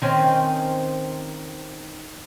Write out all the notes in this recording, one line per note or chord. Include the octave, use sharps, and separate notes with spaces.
D#3 C4 C#4